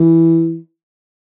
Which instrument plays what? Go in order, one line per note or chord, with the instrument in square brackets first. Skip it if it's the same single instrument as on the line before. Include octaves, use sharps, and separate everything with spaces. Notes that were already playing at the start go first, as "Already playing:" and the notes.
Already playing: [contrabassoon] E3